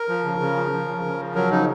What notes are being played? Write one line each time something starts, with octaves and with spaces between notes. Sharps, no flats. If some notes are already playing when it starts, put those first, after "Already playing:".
Already playing: A#4
F3
C#3
C#3
F3
F3
C#3
C#3
F3
F#3 A#4
C#3 D#4